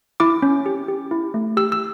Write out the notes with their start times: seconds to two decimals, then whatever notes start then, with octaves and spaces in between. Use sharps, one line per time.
0.20 E4 D6
0.42 C#4
0.66 G4
0.88 G4
1.11 E4
1.34 A3
1.57 G4 E6
1.72 E6